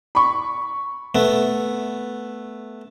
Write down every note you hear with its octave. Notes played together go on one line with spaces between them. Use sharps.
B5 C#6
A3 B3